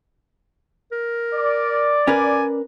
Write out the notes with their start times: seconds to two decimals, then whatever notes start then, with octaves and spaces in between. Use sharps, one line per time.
0.92 A#4
1.34 D5
2.07 C#4 A#4 B4 G#5